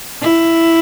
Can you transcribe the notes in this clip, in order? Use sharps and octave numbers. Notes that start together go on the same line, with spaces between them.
E4